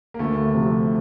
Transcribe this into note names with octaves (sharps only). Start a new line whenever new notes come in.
A#3
D2 A3
C3 F3